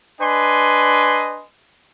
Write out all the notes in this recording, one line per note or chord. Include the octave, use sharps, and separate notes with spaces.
D4 B4 D#5 G#5 C6